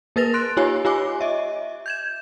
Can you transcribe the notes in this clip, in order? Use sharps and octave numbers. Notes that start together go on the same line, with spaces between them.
A#3 A#4 B4 A6 A#6 F7
C6 F#6 D7
D#4 F4 G4 C#5 G#5
F4 G4 C#5 G#5 D6
D#5 E5
G6 G#6 E7